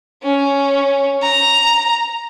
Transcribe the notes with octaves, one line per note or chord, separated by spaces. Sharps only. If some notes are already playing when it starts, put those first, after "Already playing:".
C#4
A#5